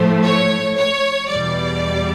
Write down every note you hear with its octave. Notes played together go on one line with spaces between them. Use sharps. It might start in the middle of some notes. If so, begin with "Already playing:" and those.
Already playing: A2 F3 A3 C5
C#5
C#5
E2 B2 G3 D5